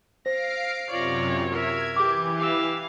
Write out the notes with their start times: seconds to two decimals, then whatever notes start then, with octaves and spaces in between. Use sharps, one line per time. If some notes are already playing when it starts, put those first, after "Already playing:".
0.26 C5 F5 A#6 C7 D7
0.90 F#2 C3 F4 C#5 D5 A#6
1.52 A#4 E5 G#6
1.96 E3 G4 D6
2.40 G4 F5 E6